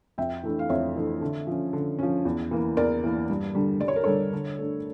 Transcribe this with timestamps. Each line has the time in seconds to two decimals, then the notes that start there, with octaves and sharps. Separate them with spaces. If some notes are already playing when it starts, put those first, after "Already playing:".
0.18 F2 E5 G5
0.43 E3 A3 D4
0.59 F5
0.69 F2 C#5 E5
0.96 E3 A3 D4
1.21 D3
1.47 F3 C#4
1.73 D3
1.99 F3 C#4
2.25 E2
2.51 E3 A#3
2.77 E2 A#4 D5
3.04 E3 A#3
3.29 G2
3.55 D3 G3 D4
3.81 G2 D5
3.88 C#5
3.96 A#4
4.03 D3 G3 D4 A4 C#5
4.33 D3
4.58 A3 D4